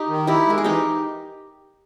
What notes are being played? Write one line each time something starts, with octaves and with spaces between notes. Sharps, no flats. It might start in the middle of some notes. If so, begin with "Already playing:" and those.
Already playing: D#4 G4
D#3
D#4 E4 G4
G#3 A#4
G#4
E3 D#4 G4